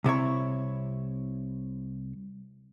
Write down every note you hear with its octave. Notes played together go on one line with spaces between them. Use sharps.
C2 C3 E4 C#5